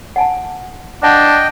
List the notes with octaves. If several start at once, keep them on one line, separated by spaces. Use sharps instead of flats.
F#5 G#5 A5
D4 D#5 F#5 G5 A5